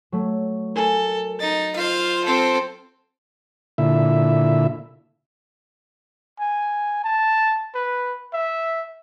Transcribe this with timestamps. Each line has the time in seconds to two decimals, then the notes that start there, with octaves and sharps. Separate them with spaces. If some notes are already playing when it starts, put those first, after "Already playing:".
0.12 F#3 A3
0.76 A4 A#4 G#5
1.40 D#4 A6
1.76 F4 C5 F5
2.24 C4 A4
3.78 A#2 D3 E4 E5
6.40 G#5
7.04 A5
7.75 B4
8.34 E5